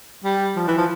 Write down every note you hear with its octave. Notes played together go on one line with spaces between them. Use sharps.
G3
F3
E3
F3